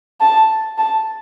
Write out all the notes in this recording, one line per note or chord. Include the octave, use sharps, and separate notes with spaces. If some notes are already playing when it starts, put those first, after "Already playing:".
A5
A5